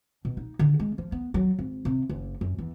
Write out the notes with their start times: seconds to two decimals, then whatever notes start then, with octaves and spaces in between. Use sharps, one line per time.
0.25 B2
0.37 D#4
0.59 D3
0.80 G#3
0.98 F3
1.12 B3
1.34 F#3
1.59 G#1
1.85 C3
2.09 F#1
2.41 F#2
2.58 E2